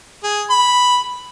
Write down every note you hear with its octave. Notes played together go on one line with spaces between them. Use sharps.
G#4
B5